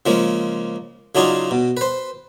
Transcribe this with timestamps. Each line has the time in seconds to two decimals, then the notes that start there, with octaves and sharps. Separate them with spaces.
0.06 C#3 F3 G#3 A#3
1.15 C#3 F#3 D4 D#4 F4 G#4
1.51 B2
1.77 B4 C5